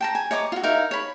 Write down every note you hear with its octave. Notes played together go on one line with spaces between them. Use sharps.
G5 A5 A#5
G#5
C#5 D#5 A#5 D6
F4 F#4
D#4 E4 A#4 F5
C#5 B5